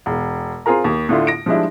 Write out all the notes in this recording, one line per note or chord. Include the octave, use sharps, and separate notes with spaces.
E1
C4 F4 G#4 A#4 A#5
D#2
A2 D3 A3 E4 F4
A#6 D7
F3 G3 G#3 D4 E4